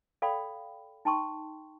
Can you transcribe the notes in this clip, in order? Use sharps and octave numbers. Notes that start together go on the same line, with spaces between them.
A4 D5 F5 G5 B5
D#4 G5 A5 C6 C#6